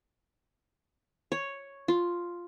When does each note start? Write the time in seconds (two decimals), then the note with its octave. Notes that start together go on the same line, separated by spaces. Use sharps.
1.32 C#5
1.88 F4